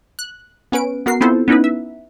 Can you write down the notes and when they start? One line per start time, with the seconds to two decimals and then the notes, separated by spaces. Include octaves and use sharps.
0.19 F#6
0.72 B3 C#4 B4 D7
1.06 B3 F#4 A#4 C7
1.21 B3 C4 E4 F4 A4 C5
1.48 B3 C#4 D#4 E4 B4
1.64 E5